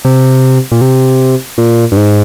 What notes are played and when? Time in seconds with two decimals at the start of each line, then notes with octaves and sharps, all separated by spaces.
0.05 C3
0.72 A#2
0.81 C3
1.58 A#2
1.92 G2
1.97 G#2